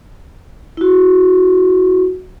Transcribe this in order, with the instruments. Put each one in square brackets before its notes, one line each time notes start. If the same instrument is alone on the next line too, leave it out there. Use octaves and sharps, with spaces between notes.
[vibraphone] E4 F#4